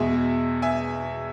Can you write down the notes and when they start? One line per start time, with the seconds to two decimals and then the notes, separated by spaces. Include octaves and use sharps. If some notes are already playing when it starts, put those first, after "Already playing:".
Already playing: E2 B2 G#3 E5 G#5
0.62 E5 G#5